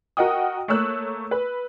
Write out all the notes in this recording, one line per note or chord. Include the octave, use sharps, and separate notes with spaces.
F#4 A#4 D#5 F#5 G5 D#6
A3 A#3 C#5 E6 F#6
B4